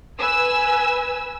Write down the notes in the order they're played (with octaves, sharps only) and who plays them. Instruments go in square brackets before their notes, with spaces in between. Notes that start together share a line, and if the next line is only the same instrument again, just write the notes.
[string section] B4 G#5 E6